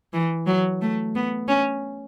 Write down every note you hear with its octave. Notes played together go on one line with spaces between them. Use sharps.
E3
F#3
A3
B3
C#4